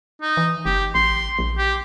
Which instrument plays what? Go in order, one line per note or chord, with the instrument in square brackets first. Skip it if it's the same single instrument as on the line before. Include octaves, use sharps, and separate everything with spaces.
[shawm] D#4
[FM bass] E3
[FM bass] F#1 [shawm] G4
[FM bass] A1 [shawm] C6
[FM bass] A#1
[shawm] G4